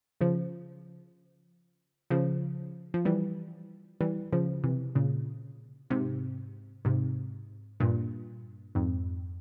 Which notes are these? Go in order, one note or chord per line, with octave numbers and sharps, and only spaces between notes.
C#3 F3
C#3 F3
F3
E3 G3
E3 G3
C#3 F3
C3 E3
A#2 C#3
G#2 C3
G#2 C3
G2 A#2
F2 G#2